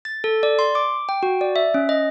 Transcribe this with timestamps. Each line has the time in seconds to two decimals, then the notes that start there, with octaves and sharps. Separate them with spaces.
0.05 A6
0.24 A4
0.43 D5
0.59 C6
0.75 D6
1.09 G5
1.23 F#4
1.41 D5
1.56 E5
1.74 C#4
1.89 D#5